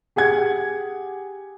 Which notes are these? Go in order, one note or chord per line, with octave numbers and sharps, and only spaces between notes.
G4 G#4 F#5 G#6